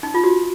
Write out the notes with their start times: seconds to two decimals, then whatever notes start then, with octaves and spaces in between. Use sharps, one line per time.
0.03 D#4
0.14 F4
0.24 F#4